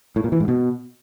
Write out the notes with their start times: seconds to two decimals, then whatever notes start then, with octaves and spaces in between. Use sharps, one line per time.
0.16 A2
0.24 A#2
0.32 E3
0.40 G#2
0.48 B2